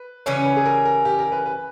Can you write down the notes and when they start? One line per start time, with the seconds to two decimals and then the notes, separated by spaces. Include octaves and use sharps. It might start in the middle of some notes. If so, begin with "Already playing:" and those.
Already playing: B4
0.26 C#3 E3 G3 C#4 C#5
0.45 B4
0.57 G#4
0.65 A#4
0.85 A#4
1.05 G4
1.19 A#4
1.32 B4
1.46 B4